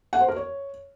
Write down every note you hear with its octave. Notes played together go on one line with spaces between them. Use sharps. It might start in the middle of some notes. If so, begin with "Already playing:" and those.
F#5
C5
A#4
C#5